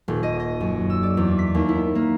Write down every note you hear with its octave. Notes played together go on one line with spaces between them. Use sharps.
D#1
D#5
D#5
F#2
E6
D5
E2
B6
D#2
E4
A#3